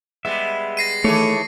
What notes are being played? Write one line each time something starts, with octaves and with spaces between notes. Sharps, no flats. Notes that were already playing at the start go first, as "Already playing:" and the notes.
G3 G#3 B3 E5
A#6 C7 D#7
D#3 E3 A3 G#4 A4 C#5